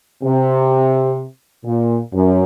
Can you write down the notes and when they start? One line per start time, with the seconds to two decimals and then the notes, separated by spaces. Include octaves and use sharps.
0.23 C3
1.65 A#2
2.13 F#2